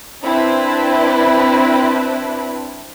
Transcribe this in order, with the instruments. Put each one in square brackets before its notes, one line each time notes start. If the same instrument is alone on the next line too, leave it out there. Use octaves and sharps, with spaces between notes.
[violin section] C4 D4 E4 B4